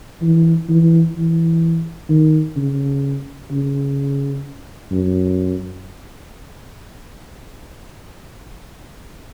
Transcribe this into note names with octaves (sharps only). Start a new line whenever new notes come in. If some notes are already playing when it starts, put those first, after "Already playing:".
E3
E3
E3
D#3
C#3
C#3
F#2